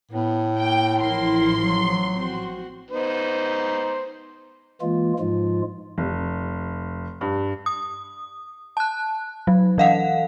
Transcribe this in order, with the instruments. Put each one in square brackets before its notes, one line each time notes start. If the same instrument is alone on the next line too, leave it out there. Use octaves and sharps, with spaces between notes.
[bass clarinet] A2 [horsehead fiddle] B3
[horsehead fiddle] A#3 [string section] G5
[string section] A1 F3 C6 [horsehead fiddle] E4 A#4
[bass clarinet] F#3
[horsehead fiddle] C4 F#4
[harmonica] B3 D#4 C5
[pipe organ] E3 G#3 A#3 F4
G#2 F3 G#3 F4
[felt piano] F1
G2
[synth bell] D#6
A5 F#6
F#3
E3 F5 F#5